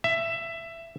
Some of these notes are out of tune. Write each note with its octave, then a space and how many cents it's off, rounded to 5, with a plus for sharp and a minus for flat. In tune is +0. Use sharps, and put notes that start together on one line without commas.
E5 +15